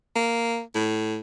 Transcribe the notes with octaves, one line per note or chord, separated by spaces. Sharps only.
A#3
A2